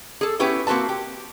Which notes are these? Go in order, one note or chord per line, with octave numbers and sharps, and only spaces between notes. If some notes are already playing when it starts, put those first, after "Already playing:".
G#4 A4
B3 C#4 E4 G4 B4
A#3 C4 F#4 B4 A5
G4